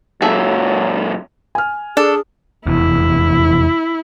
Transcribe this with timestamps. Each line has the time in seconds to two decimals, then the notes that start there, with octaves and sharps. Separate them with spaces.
0.22 F#2 A#2 F#3 E4 G#4 A4
1.55 G#5 F6
1.97 D4 G#4 A4
2.66 F1 E2 E4